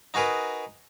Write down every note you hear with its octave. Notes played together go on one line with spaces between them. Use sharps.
D#4 F#4 G#4 A#4 B4